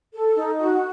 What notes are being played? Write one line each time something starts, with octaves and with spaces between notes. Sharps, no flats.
A4
D#4
F#4